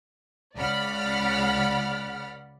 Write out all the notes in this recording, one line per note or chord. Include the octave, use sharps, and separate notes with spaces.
C#2 C#3 D5 F#5 B5 F6